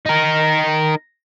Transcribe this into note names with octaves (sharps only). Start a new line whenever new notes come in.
D#4 A#4